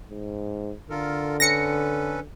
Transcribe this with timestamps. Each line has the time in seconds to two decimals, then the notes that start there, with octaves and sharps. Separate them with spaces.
0.10 G#2
0.90 D3 F4 A4 A#4
1.40 C#4 A4 B4 A#6 C#7